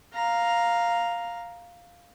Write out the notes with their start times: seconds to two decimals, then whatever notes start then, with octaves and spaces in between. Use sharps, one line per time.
0.14 F5 A#5